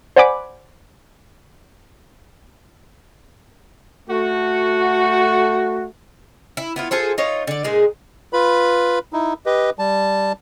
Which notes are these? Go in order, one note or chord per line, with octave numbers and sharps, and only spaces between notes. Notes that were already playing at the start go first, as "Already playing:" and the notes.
C5 D5 F#5 G#5 B5 D6
A3 F#4
E4
B3 E4 F4
F4 G#4 A4 C5
D#4 F4 C#5
D3 D5
A#2 G#3 G#4
F4 B4 B5
D#4 E4
G4 B4 D#5
G3 A5